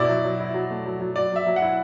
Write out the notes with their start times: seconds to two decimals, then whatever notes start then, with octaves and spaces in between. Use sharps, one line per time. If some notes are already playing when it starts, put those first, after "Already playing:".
Already playing: B2 E4 D5
0.09 F#3
0.24 F#3
0.40 E4
0.54 F#3
0.70 A3
0.86 F#3
1.00 F#3
1.16 F#3 D5
1.32 F#3 E5
1.47 F#3
1.56 F#5
1.62 E4